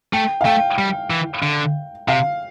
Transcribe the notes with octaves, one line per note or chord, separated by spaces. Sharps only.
A3 G5
F5
A3 G5
G3
E3
D3
C3 F5